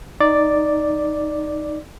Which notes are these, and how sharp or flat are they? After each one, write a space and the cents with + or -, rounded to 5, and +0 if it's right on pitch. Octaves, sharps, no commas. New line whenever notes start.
D#4 -5 D5 +0